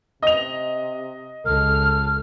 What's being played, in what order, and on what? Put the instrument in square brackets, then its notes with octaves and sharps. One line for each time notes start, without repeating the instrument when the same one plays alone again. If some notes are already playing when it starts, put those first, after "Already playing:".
[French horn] C3 [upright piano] D#5 F7
[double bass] C#2 [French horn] A4 [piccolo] F6